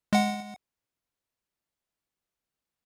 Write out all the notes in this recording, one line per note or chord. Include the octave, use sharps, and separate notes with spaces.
G#3 F#5